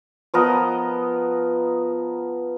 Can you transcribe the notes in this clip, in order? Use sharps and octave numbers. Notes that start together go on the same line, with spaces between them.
F3 B3 A#4 D#5